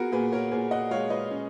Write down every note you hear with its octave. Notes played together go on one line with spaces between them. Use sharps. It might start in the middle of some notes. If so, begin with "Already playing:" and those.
Already playing: B3 F#4 G#4 A#4
A#2 G#4 B4
A#4 C#5
A#2 G#4 B4
D#5 F#5
G#3 C#5 F5
B4 D#5
C#4